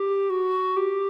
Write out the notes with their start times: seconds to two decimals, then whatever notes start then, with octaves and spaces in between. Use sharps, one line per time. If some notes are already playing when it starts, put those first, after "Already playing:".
Already playing: G4
0.30 F#4
0.76 G4